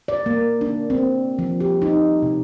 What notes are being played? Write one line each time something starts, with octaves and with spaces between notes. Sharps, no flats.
D5
A#3
D4
C4
F3
G4
D#4
C3